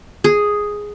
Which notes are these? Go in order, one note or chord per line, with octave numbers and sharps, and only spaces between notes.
G#4